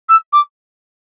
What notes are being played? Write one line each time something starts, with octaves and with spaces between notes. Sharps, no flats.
E6
D6